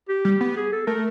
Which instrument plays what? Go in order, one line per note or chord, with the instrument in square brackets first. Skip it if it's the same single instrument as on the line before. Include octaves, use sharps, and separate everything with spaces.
[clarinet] G4
[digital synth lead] G3
B3
[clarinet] G#4
A4
[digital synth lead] A3 [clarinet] A#4